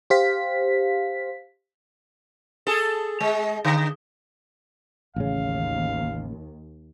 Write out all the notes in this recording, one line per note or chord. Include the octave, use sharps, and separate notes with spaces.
G4 C5 F5 B6
G#4 A4
G#3
D3
A1 D#2 C#3 F5